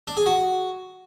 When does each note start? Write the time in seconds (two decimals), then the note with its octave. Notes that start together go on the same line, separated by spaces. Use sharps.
0.08 D4
0.17 G#4
0.26 F#4